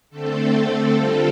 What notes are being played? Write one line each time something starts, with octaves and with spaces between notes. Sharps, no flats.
D3 A3 C4 A4
D3 G3 C4 F4 A4